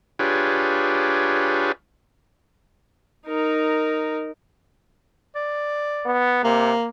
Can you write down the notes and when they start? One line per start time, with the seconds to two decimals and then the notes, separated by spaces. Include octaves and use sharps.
0.19 D4 F4 G4 G#4 B4 C#5
3.27 D#4 A#4
5.35 D5
6.05 B3
6.44 C3 A#3